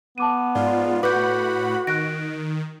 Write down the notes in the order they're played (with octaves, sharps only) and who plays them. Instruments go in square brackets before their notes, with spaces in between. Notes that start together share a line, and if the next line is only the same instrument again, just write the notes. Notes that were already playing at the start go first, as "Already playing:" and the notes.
[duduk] B3 [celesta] A5 D6 D#7
[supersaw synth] G#2 F4 [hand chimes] D5
[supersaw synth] A2 F#5 B5 [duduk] F#4 [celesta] B4 [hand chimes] D6 G6
[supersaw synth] D#3 [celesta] F#6 A#6 [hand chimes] D7